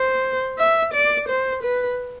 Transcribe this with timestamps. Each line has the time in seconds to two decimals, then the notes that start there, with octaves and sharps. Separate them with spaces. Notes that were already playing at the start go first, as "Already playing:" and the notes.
Already playing: C5
0.58 E5
0.93 D5
1.28 C5
1.62 B4